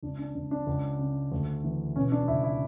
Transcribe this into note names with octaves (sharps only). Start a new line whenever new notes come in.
C#2 D4
D4
C#2 D4
D4
C#2
C#3
D2
E3
B2 C#4
D4
C#2 E4
E4